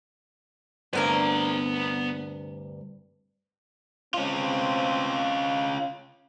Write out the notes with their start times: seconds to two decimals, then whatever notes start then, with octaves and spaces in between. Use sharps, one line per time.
0.93 D2 G2 C3 B3 A#4 G#5 A#5
4.14 C4 C#4 F4